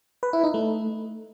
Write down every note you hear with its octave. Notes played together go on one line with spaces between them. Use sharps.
B4
E4
D#4
A3